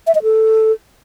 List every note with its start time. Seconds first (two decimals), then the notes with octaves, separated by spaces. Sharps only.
0.07 E5
0.15 D#5
0.23 A4